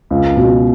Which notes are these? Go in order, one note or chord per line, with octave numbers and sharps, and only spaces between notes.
C#2
B2